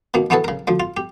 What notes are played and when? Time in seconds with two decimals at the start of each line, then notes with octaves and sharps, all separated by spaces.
0.14 B2 D#3 A#3
0.30 E3 B3 F#4 G#4 A4 B4
0.44 C#3 A#4
0.67 D2 F3
0.80 F4
0.97 G4